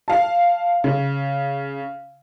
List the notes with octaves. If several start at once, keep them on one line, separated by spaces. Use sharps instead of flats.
F5 A5
C#3